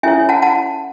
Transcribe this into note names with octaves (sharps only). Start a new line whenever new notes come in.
C#4 E4 A4 C#5 E5 G#5
F#5 A5
F#5 A5